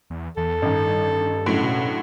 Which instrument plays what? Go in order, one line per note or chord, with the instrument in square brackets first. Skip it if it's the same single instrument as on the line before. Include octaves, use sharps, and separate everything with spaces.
[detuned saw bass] E2
[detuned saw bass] E2 [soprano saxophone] A4
[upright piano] A1 D#3 [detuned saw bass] G2
[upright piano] F#1 F#2 D7 [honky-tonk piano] A2 D3 F#3
[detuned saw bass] B2